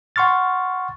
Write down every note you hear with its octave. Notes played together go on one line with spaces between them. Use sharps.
F#5 C6 C#6 F6 A6